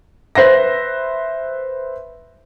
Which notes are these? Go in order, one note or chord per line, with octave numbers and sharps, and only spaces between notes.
B4 C5 E5 A#6